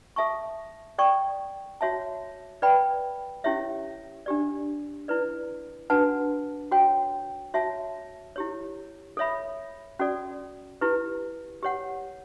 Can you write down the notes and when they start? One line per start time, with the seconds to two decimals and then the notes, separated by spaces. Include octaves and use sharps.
0.16 A4 E5 A5 C#6
0.98 A4 D5 G5 C#6
1.81 F#4 C#5 E5 A5
2.62 B4 D5 G5 B5
3.44 C#4 E4 G4 C#5 E5
4.26 D4 G4 D5
5.08 E4 B4 D5
5.90 D4 F#4 B4 F#5 A5
6.72 F#4 C#5 G5
7.54 F#4 C#5 E5 A5
8.36 E4 G4 C#5
9.17 A4 C#5 E5 B5
9.99 C#4 F#4 A4 D5
10.81 E4 G4 B4
11.63 G4 C#5 F#5